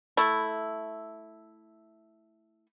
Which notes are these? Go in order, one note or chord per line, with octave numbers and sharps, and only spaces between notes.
A3 E4